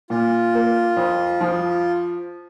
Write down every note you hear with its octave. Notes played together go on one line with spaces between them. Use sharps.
A#2 F4
A#3
F2
F3